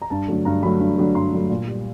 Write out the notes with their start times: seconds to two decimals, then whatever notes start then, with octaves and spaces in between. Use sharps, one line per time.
0.02 A#5
0.10 G2 A5
0.28 D3 F#3 A3
0.45 G2 A#5
0.63 D3 F#3 A3 B5
0.80 G2
0.98 D3 F#3 A3
1.15 G2 C6
1.33 D3 F#3 A3
1.50 A#2
1.67 G3